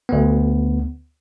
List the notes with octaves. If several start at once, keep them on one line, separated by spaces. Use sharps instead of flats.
D2 B3